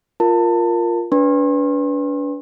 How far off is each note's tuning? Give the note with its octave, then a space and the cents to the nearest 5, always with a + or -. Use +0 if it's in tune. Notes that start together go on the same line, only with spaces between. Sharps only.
F4 +0 A#4 +0 A5 +25
D4 -35 B4 +0 C6 +45